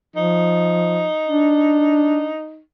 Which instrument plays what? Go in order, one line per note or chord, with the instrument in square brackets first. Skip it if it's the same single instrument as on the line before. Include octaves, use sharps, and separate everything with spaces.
[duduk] F3 [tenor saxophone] D#4
[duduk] D4